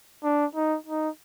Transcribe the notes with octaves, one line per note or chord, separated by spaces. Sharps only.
D4
D#4
D#4